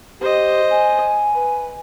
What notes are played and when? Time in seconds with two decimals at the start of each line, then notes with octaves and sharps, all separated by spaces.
0.21 G4 C5 D#5
0.70 G#5
1.34 B4